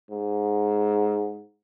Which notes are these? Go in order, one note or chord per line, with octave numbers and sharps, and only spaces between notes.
G#2